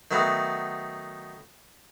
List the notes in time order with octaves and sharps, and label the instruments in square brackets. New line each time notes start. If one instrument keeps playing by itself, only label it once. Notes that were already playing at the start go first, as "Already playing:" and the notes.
[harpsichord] D#3 F#3 A3 B3